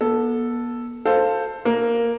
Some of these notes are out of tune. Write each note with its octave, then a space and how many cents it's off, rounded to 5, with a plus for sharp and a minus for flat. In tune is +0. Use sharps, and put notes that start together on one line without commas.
B3 -40 A4 +0
A4 +10 C5 +0 F5 +0
A#3 +0 A#4 +0